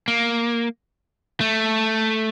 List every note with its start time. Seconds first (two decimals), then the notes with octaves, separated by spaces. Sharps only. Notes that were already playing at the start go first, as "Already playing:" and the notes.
0.08 A#3
1.41 A3